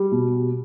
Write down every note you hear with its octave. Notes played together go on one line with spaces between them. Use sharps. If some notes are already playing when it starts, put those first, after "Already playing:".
Already playing: G3
B2